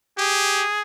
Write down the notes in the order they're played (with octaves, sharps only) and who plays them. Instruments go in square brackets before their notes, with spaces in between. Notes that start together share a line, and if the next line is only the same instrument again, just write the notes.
[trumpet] G4 [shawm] G#4